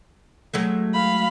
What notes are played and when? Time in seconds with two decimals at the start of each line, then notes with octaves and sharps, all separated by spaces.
0.54 F#3 G#3 A3
0.94 F5 B5